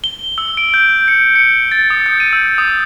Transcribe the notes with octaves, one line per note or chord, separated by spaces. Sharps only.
G7
E6
D7
G6
C#7
C#7
A6
D#6
G6
D#7
E6
D#6